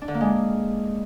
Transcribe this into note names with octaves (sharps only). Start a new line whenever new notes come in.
D4
D3
A#3
G#3